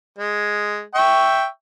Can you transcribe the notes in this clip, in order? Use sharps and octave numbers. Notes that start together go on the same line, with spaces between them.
G#3
E5 G5 C#6